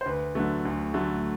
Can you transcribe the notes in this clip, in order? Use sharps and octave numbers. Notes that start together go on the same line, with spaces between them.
C5
D2 B4
D3 F#3 A3
D2
D3 F#3 A3